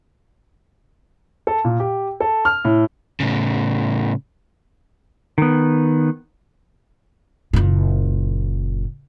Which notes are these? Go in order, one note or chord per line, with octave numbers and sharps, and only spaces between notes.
A4
A#2
G4
A4
F6
A2
A2 C#3
D#3 B3
F#1 A#2